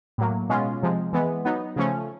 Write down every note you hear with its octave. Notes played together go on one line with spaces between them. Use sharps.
A2 F#3 A#3
B2 G#3 C#4 F4
C3 F3 G#3
E3 G#3 B3
F#3 B3 D#4
C#3 F3 A3 C#4